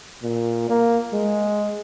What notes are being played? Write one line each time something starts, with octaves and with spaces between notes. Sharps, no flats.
A#2
A#3
G#3